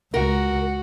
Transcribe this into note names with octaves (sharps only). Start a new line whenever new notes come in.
C#2 F#4 A#4